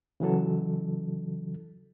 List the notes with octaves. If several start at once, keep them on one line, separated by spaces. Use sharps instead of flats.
C#3 E3 F#3 A4